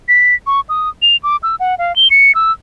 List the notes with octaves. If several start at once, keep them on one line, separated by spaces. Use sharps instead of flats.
B6
C#6
D#6
F7
D6
E6
F#5
F5
G7
C#7
E6